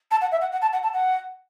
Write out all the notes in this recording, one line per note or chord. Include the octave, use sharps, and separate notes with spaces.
A5
F#5
E5
F#5
F#5
A5
F#5
A5
F#5